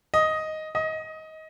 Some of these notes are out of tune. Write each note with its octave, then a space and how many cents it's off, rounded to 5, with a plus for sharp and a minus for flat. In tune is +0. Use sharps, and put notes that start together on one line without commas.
D#5 +5
D#5 +20